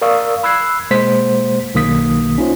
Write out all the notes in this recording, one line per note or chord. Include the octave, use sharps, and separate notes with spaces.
A#4 D5 F5 C#6 D#6 E6
B5 E6 F#6 G#6 C7
B2 G#3 A#3 C5 B6
B1 D#3 A#3 D#6 B6
C#4 D#4 F4 C5 C#5